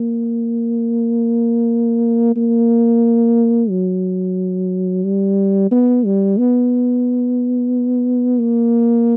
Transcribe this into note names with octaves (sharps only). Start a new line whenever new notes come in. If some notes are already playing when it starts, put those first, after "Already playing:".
Already playing: A#3
A#3
F#3
G3
B3
G3
B3
A#3